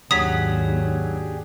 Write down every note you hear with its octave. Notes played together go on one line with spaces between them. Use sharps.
D#2 G#2 F#3 D4 G4 G#4 D#6 B6